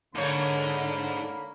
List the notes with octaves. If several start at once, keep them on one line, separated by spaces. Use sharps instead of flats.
G#2 D3 A#3 A#4 C#5 B5